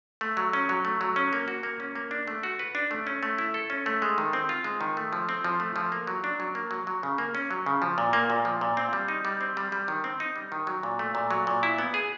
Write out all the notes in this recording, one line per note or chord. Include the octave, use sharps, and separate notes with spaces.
A3
F#3
C#4
F#3
A3
F#3
C#4
A#3
F#4
A#3
C#4
A#3
D4
A3
F#4
B4
D4
A3
C#4
A3
E4
A4
C#4
A3
G#3
D#3
C4
F4
G#3
D#3
A3
F3
C4
F3
A3
F3
A#3
F#3
D4
F#3
A#3
F#3
F#3
C#3
A#3
C#4
F#3
C#3
F3
A#2
A#3
A#2
F3
A#2
C4
G3
D#4
G3
C4
G3
G3
D#3
C4
D#4
G3
D#3
F#3
A#2
A3
A#2
F#3
A#2
E4
B3
G#4